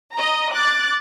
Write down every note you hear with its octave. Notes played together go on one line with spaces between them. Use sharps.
D#5 A#5
D6 F#6 A6